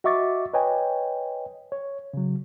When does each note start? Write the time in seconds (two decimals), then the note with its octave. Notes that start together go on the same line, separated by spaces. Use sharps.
0.04 F#4 D#5 E5 C#6 D6 A6
0.53 B4 C#5 D#5 G5 G#5
1.72 C#5
2.14 C#3 F#3